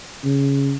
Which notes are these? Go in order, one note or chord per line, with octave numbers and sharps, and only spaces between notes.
C#3